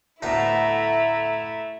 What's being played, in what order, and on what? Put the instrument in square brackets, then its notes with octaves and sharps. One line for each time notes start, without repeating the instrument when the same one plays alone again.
[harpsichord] D2 A2 B3 [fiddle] A3 [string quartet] E4 [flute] A#5